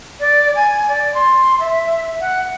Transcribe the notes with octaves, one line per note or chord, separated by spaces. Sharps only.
D5
G#5
D5
C6
E5
F#5